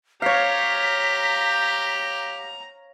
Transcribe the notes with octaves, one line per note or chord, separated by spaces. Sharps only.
G4 C#5 F5 A#5 B6